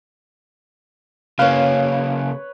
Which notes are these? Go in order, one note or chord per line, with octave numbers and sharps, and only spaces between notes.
C#3 A#3 B4 C#5 F5